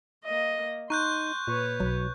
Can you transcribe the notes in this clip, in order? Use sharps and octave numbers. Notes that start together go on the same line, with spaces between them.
A#3 D#5
D#4 C6 C#6 F#6 G6
A#2 B4 C#5
B1 F#3